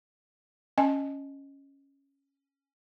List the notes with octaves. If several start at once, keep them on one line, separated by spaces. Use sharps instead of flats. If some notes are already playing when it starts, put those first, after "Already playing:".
C#4 D#5 G#5